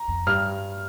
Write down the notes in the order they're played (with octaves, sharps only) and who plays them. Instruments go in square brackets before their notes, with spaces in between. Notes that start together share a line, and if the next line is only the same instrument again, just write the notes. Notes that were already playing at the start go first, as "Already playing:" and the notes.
Already playing: [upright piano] A#5
[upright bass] F2
[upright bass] G2 [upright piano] F6